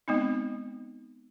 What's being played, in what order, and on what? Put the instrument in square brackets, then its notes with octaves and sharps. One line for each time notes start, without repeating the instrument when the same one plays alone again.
[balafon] G#3 B3 C4 D#4